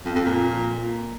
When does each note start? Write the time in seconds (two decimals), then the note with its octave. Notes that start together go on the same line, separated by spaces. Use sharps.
0.05 F2
0.15 F2
0.25 A#2